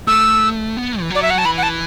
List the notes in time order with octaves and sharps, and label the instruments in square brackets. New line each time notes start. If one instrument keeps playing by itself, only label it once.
[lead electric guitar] A3 [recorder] E6
[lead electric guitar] B3
E3
[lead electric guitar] F#3 [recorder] D5
[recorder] E5
F#5
A5
[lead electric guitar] E3 [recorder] B5
[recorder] F#5
A5